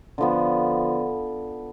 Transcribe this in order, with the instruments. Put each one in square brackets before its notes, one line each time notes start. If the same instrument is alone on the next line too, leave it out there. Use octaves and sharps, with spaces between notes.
[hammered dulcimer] D3 F3 B3